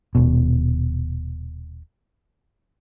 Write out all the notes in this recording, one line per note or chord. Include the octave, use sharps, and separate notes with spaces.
D#1 B2